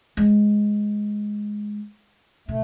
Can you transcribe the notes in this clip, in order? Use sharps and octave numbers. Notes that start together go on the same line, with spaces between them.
G#3
B2 A3